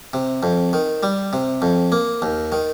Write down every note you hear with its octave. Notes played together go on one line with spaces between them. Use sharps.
C3
F2
D#3
G3
C3
F2
A#3
D#2
D#3